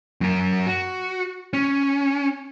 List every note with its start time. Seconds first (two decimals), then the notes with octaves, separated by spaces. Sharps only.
0.21 F#2 A#4
0.67 F#4
1.53 C#4